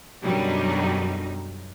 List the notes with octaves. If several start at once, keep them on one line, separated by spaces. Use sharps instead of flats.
F#2 B2 D3 F#3 G3 D#4